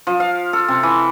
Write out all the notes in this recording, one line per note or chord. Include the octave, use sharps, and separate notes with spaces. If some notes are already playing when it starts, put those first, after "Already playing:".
F3
F5
A4
C3
E3